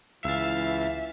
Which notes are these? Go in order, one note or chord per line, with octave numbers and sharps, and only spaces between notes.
C#2 E3 E5 F5 A6